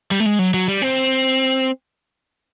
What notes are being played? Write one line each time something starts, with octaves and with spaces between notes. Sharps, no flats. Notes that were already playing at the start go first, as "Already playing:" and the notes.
G3
A3
G#3
F#3
F#3
G3
C4